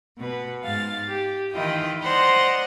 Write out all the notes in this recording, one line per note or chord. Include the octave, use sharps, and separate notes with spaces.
B2 B4
G#2 F5 A6
G4
D#3 E3 E4 F4 D#5 G5
C5 D5 D#5 F#5 A#5